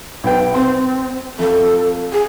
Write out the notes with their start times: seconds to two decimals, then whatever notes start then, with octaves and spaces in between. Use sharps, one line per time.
0.24 B1 B3 G5
0.54 C4 C6
1.39 F2 A4
2.13 G#4